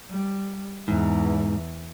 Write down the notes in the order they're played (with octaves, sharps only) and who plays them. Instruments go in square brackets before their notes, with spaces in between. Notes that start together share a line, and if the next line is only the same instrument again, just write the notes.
[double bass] G3
[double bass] E2 E3 [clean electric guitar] G#2